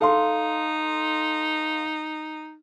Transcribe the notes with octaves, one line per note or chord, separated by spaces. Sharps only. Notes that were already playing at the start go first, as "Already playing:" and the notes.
D#4 A4 F5 C6